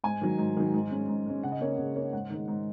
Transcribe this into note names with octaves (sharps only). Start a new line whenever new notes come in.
G#2 G#5
D#3 F#3
G#2
D#3 F#3
G#2
G#3 C#4
G#2
G#3 C#4
C#3 F#5
D#5
A#3 C#4 C#5
C#3 G#4
A#3 C#4 C#5
G#2 F#5
D#3 G#3
G#2